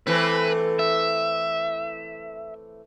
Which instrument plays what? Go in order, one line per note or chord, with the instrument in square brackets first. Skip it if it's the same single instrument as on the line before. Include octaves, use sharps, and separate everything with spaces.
[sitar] E3 A3 C4 [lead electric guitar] B4
[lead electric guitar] E5